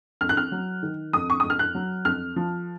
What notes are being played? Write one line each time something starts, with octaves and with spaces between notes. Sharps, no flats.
F2 F6
F#6
F6
F#3
D#3
F2 D#6
C#6
F2 D#6
F6
F#6
F#3
F2 F6
F3